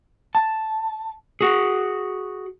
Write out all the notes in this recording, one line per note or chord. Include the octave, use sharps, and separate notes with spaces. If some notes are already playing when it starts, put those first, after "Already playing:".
A5
F#4 G#4